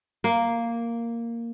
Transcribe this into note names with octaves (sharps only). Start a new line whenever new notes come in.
A#3